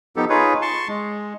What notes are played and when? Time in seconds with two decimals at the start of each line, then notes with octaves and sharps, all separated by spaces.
0.16 F3 B3 D#4 G4 A4
0.29 D#4 F4 G#4 B4 C#5
0.62 A5 C6 C#6
0.88 G#3